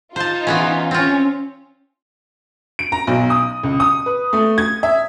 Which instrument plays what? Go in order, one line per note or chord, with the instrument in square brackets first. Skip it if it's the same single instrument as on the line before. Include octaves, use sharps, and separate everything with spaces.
[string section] D#4 F4 [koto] C5 A5
[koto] E3 B3 C#4
[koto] C4 F4 [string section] C#4
[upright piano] D7
A#5
B1
D#6
C#2
D#6
B4
A3
G#6
E5